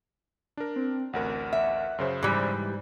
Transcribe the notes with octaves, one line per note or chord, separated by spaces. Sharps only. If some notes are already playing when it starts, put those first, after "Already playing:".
D4 A#4
C4
A1 D2 A#4 F#5
E5
F#2 C#3 C5
G#2 E3 G3